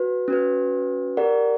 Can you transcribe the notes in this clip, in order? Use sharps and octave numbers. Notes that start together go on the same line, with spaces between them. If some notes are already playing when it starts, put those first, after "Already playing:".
Already playing: F#4 B4
C#4 F#4 B4
G4 A#4 D5 F#5